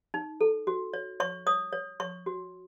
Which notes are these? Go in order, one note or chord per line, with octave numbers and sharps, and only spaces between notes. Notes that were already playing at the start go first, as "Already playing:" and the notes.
D#4
A4
F#4
C#5
C#5 C#6
C#5 D#6
C#5
C#5 C#6
F#4